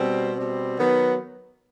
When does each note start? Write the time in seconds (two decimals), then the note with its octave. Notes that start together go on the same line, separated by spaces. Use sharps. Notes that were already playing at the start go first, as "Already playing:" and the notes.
Already playing: B2 G3 C4
0.34 B2 G3 C4
0.78 D#3 F#3 B3